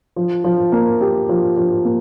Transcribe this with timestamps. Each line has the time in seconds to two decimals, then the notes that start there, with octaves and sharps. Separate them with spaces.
0.16 F3
0.44 F3
0.72 A#3
1.01 G4
1.29 F3
1.57 F3
1.85 A#3